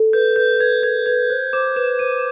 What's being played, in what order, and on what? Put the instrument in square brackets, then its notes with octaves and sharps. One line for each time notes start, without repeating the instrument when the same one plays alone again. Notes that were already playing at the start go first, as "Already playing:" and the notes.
Already playing: [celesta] A4
[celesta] B4 [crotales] G6
[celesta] B4 [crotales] G6
[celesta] B4 [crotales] G#6
[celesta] A#4 [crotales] G#6
[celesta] B4 [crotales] G#6
[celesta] C5 [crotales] F#6
[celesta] C5 [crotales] D6
[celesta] B4 [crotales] E7
[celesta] C5 [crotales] D#7